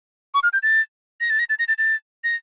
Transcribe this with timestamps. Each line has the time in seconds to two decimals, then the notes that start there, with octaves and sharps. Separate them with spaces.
0.34 C#6
0.43 F6
0.53 G6
0.63 A6
1.21 A#6
1.30 A6
1.39 A#6
1.49 A6
1.59 A#6
1.68 A6
1.78 A6
2.24 A#6